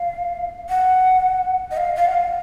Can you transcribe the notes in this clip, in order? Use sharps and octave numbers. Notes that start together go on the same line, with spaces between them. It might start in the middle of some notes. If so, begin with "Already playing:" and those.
Already playing: F5
F#5
D#5
F5
F5
F#5
F5